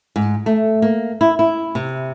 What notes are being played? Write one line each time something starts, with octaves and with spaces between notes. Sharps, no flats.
G#2
A3
A#3
E4
E4
C3